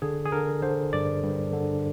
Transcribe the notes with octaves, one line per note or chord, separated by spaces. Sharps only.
D3 G#4
G#4
D3 A#4
D3 C5
G2 D5
G2
D3